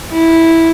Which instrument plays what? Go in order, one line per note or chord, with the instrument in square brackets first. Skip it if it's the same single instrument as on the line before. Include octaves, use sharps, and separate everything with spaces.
[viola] E4